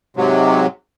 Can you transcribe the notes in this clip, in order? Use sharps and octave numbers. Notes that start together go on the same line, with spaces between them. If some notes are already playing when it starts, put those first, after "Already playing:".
G#2 C3 F#3